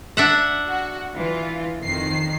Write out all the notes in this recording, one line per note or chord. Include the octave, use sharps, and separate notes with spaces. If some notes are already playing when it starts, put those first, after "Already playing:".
D4 E5 F#5
F#4
E3 F4
F2 D#3 C7